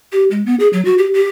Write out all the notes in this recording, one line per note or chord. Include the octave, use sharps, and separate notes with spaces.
G4
G#3
B3
G#4
F#3
F#4
G4
G4